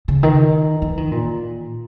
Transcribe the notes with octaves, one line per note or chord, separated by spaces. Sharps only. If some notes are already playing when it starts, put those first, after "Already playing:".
C#3
D#3
E3
D#3
A#2